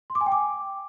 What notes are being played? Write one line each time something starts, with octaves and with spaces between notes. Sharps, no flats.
C6
D6
G#5
G5
D6